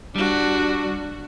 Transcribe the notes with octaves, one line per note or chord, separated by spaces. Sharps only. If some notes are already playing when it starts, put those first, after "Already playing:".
G3 D4 F#4